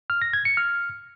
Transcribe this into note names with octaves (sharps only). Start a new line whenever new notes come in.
F6
A#6
G#6
C#7
F6